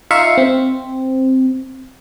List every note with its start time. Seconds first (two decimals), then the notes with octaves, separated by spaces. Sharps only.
0.11 D#4 F4 E5 F5 C#6
0.38 C4